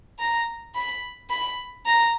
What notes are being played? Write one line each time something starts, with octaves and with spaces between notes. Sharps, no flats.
A#5
B5
B5
A#5